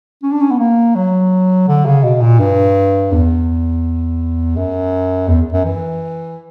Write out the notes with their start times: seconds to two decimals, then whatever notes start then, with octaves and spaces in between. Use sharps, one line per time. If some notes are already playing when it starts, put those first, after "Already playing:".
0.23 C#4
0.32 D4
0.41 C#4
0.51 B3
0.59 A#3
0.95 F#3
1.68 D3
1.86 C#3
2.03 B2
2.21 A#2
2.39 G2
3.12 E2
4.56 F#2
5.28 E2
5.53 F#2
5.65 E3